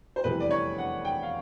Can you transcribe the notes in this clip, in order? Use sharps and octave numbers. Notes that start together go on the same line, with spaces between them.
C5
F1 E2 C3 E3 G3 B4
D5
C#5
F#5
G5
F5